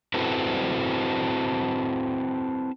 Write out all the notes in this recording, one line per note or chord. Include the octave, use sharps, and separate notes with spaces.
C4 E4 F#4 A4 B4 C5